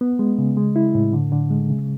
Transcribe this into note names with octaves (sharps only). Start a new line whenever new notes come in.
B3
G#3
C#3
G#3
E4
A2
D3
D3
G#3
C#3